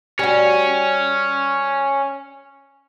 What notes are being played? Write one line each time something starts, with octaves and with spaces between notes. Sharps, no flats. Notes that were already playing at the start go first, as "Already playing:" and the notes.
G3 C#4 F#4